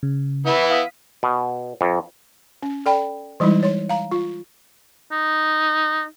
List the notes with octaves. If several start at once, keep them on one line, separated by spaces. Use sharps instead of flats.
C#3
E3 B3 E4
F5 D#6 B6
B2
F2
C#4
A4 D5 G5 B5
E3 G3 G#3 D#4 E4
C#5 C6
F5 A#5
F4
D#4